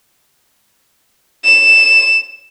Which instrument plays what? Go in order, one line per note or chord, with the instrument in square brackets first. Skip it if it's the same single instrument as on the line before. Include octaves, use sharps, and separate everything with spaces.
[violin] E7